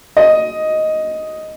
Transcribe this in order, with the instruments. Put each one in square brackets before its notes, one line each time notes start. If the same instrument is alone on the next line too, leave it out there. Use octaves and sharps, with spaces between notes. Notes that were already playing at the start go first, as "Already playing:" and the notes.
[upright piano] D#5